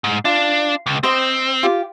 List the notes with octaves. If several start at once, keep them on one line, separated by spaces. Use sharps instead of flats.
G#2
D4 F4
C#2
C4 C5 D#5 G5
F4 G4